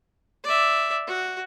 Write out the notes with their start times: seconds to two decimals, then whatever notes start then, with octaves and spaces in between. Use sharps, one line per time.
0.44 D5 E5
1.07 F#4